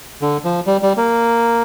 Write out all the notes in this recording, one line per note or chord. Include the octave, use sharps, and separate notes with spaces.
D3
F3
G3
G3
A#3